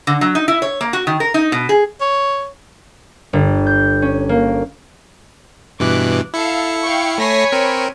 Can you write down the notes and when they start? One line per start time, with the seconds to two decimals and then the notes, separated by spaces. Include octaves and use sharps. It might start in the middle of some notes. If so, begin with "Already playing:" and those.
0.07 D3
0.21 F#3
0.35 D#4
0.48 E4
0.62 C#5
0.81 A#3
0.93 F#4
1.07 D#3
1.20 A#4
1.34 D#4
1.52 B2
1.69 G#4
2.01 C#5
3.33 G1
3.67 G6
4.02 C#4
4.29 A#3
5.80 G2 B2 E3 D6 F#6
6.34 E4 A4 F5 C#7
6.83 F5 G5 C#6
7.18 A3 C#5 G#5 B5 A#6 C7
7.52 C4 A#4